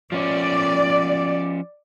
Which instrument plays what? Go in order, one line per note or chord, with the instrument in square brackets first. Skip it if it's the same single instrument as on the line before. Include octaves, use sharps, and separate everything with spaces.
[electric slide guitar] F3 C#4 [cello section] D5